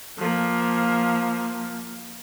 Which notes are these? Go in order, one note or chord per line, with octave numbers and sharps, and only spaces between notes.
F3 A#3